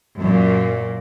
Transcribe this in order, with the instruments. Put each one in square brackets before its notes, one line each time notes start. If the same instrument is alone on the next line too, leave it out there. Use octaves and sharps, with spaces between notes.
[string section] F#2 A#2